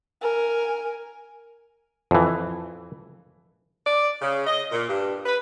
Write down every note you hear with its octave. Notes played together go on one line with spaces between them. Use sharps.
A#4 G#5
F2 E3
D5
C#3
D#5
A#2
G2
B4